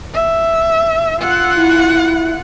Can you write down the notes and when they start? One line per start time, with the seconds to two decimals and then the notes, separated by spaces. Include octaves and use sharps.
0.14 E5
1.20 F4 F#5 E6
1.57 E4